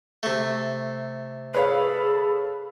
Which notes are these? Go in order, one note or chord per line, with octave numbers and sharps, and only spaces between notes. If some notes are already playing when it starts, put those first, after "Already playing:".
C3 A3
G#4 A4 B4 C#5 F5 B5